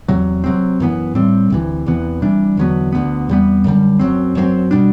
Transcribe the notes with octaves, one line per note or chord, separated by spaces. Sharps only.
E2 C3 F#3
C3 F#3 C4
F#2 E3 B3
A2 G3 C4
D2 C3 E3
E2 C3 E3 B3
C3 E3 G3 D4
E2 D3 F#3 B3
D2 D3 G3 B3
E2 C3 G3 B3
F#2 D3 G3
F#2 F#3 C4
F#2 F#3 A3 C4
B2 G3 D4